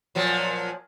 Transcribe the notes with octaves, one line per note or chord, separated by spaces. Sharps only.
A#2 F3 F#3